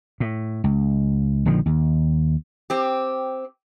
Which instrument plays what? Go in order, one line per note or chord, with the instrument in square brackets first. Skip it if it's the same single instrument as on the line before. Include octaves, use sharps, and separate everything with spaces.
[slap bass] A2
C#2
A#1 D3 D#3 F3
D#2
[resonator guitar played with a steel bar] C4 G4